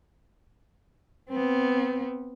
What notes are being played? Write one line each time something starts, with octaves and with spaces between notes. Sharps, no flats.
B3 C4